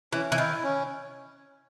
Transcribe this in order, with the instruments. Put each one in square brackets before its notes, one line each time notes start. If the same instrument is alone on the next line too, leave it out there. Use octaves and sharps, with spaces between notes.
[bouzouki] E3 [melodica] C#4
[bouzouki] E3
[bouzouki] D#3 [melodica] E4
[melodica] C#4